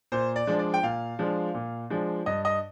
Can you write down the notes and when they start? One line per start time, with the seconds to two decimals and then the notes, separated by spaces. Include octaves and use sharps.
0.12 A#2 C5
0.36 D5
0.47 F3 G#3 D4
0.59 D5
0.74 G5
0.83 A#2 F5
1.19 F3 G#3 D4
1.54 A#2
1.90 F3 G#3 D4
2.26 G2 D#5
2.45 D#5